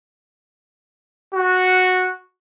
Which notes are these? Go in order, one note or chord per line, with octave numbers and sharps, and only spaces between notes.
F#4